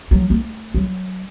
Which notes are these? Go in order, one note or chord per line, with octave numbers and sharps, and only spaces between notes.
F3 F#3
A3
F#3